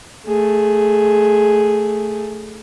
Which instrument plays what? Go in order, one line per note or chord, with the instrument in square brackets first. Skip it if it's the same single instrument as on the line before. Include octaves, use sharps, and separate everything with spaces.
[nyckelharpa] A3 G#4